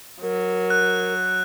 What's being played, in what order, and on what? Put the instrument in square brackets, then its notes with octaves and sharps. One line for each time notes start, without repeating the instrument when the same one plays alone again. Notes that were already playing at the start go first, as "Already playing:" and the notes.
[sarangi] F#3 [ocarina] A#4
[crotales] F#6